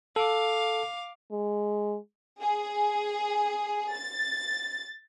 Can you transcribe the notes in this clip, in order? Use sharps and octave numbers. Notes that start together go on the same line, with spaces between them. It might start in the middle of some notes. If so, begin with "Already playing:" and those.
A4 F5 D6
G#3
G#4
A6